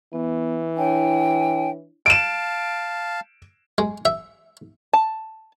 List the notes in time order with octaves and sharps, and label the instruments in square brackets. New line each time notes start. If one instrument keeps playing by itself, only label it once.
[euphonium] E3 [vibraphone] B3
[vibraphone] D4 E4 C#5 [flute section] G5 G#5
[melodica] F5 A5 [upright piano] D7 E7
[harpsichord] G#3
E5
[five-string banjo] A5